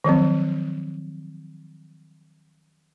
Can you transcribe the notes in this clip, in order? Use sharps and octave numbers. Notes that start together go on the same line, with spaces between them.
D#3 F3 F#3 C4